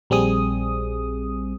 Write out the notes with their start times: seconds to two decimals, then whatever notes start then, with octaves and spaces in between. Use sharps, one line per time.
0.10 A#1 G3 C4 G#4 D#6